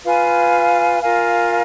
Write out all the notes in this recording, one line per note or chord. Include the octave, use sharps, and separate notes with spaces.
F4 B4 F5 G#5
F4 A#4 F5 G#5